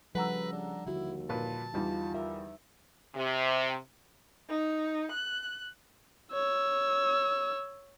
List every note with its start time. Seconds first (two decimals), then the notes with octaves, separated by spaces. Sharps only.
0.15 C#3 F3 G3 A4 B4 F#5 A#5 E6
0.53 D4
0.86 D#2 D3 E4 F#4
1.29 A#2 B4 A5
1.74 E2 G3 D#4 F4
2.14 A#4 E5
3.15 C3
4.50 D#4
5.11 F#6
6.33 C#5 E6